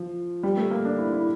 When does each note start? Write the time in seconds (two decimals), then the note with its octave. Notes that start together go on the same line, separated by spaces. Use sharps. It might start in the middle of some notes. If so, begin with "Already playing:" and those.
Already playing: F3
0.43 G3
0.57 A3
0.71 A#3
0.85 D4
0.98 E4
1.12 E4